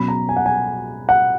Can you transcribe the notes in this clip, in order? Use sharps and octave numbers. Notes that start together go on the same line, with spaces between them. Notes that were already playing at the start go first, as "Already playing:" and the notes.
Already playing: B2 F#3 C#4 B5
A#5
G#5
F#5
G#5
F#5